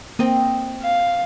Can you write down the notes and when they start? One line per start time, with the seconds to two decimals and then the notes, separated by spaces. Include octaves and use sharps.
0.19 A#3 C4 D#5
0.82 F5